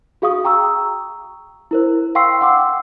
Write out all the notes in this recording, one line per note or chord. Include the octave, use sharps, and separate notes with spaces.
F#4 G#4 F5 C#6 D#6
G5 A#5 C#6 E6
E4 A#4 C5
F5 G5 C6 C#6 E6 C7
F#5 G5 C6 D6 E6